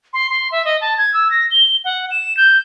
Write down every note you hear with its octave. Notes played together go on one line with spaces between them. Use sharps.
C6
C6
E5
D#5
A5
G#6
E6
A#6
G7
F#5
E7
G6